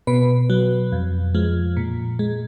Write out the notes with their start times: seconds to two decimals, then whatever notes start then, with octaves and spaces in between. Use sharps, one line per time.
0.07 B2 B4
0.50 F#3
0.92 F2
1.34 F3 G#3
1.77 A#2
2.19 G#3